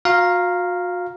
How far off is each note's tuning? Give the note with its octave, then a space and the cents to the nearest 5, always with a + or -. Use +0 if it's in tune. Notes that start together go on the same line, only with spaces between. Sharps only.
F#4 -40 F5 +0 A#5 +0